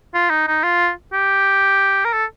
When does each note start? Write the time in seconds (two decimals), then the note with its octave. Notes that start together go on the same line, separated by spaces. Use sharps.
0.15 F4
0.30 D#4
0.48 D#4
0.64 F4
1.13 G4
2.05 A#4
2.13 A4